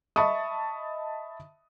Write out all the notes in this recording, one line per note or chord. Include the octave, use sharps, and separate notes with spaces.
D#5 E5 A5 B5 C#6 D#6